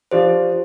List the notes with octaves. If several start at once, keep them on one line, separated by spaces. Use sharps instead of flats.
F3 D4 F4 G4 C5